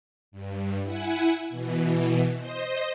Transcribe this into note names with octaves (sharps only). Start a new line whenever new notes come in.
G2
E4 F#5 G#5
B2 E3
C5 D#5